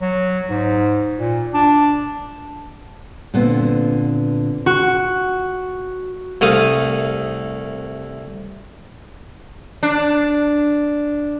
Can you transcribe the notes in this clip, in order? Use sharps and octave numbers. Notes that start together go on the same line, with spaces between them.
F#3
G#2
A#2
D4
A#2 D3 B3 C4
F#4
C2 A3 F5 D#6
D4